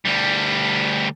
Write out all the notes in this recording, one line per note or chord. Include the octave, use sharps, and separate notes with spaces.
D2 G3